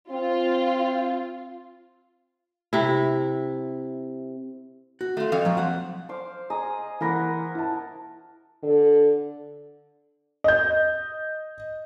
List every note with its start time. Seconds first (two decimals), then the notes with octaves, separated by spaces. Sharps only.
0.11 C4 F4
2.73 C3 E4
5.01 F#4
5.17 A3 F4
5.32 F2 F5
5.45 F3 F#3
5.57 C5 F#5
6.09 C5 F5 D6
6.50 G#4 D#5 A#5
7.01 E3 A#3 A#4 F#5 B5 A#6
7.55 E4 A5
8.63 D3
10.44 D#5 G6